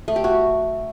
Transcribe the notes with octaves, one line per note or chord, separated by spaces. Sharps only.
A3
G4
F#4